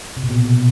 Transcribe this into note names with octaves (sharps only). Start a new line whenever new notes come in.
C3
A#2
B2